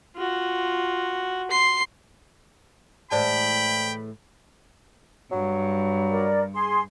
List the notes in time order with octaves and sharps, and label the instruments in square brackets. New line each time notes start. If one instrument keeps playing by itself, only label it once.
[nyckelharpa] F4 F#4
[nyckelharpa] C6 [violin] C7
[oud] A2 E3 G#3 [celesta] C5 D5 A5 [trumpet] G5 [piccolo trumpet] B5
[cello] G2 [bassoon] F#3
[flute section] A#4 D5
G#4 C6